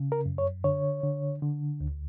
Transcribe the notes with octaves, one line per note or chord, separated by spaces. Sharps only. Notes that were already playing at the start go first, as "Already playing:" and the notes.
Already playing: C#3
A#4
F#2
C#5
D3 C#5
D3
D3
D2